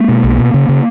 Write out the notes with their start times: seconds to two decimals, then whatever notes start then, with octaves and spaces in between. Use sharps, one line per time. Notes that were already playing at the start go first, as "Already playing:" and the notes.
Already playing: G#3 A#3
0.09 B2
0.24 B1
0.39 B2
0.54 C#3
0.69 C#3